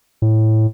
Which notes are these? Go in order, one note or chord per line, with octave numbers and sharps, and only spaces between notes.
A2